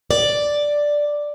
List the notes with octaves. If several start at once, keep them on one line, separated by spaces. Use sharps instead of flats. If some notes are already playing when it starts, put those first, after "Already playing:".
D5